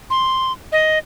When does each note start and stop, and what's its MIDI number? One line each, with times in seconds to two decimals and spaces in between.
0.10 0.52 84
0.72 0.98 75